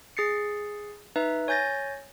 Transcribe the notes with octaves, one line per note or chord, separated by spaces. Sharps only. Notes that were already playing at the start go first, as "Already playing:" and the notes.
G#4 A6 C7 C#7
D#4 B4 E5
C#5 G#5 G6 A6 A#6